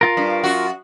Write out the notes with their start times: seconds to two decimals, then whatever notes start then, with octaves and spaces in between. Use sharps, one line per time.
0.01 F4 A#4
0.17 G2
0.44 F#2 F#4